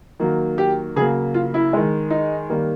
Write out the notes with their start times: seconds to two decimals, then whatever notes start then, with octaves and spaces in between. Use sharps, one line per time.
0.19 D#3 F#3 A#3
0.58 G4
0.96 C#3 F#3 A#3 G#4
1.34 F4
1.54 E4
1.73 D#3 G#3
2.10 D#4
2.50 D#3 G3 A#3